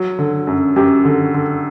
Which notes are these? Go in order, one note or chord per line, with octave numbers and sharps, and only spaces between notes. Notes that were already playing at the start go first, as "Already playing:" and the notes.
Already playing: F#3
D3
F#2
F#2 G4
D3
D3